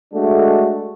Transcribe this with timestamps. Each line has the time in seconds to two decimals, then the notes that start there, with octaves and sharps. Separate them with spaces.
0.13 G#3 A3 D4 F#4 A4